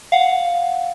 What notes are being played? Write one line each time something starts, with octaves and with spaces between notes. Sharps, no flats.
F5 F#5